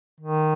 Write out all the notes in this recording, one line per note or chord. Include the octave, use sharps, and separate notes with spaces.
D#3